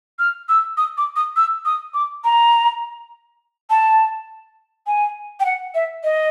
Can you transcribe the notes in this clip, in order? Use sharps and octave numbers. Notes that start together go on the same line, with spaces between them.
F6
E6
D#6
D6
D#6
E6
D#6
D6
A#5
A5
G#5
G5
F#5
E5
D#5